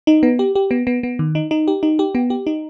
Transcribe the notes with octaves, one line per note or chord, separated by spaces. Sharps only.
D#4
B3
G4
G4
B3
B3
B3
D#3
D#4
D#4
G4
D#4
G4
B3
G4
D#4